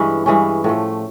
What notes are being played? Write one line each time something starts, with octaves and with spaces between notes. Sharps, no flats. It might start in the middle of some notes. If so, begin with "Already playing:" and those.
Already playing: G2 E3 G#3 C#4
G2 E3 G#3 C#4
A2 F3 A3